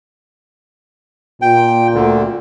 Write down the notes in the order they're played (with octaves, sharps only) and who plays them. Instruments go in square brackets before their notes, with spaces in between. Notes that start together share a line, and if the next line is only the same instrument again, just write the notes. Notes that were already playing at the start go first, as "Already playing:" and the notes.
[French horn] A#2 [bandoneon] G5
[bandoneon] D2 D3